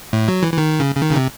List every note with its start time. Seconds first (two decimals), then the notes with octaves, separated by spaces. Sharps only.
0.13 A2
0.28 F#3
0.43 E3
0.53 E3
0.58 D#3
0.80 C#3
0.96 C#3
1.02 D#3
1.11 C#3
1.16 C3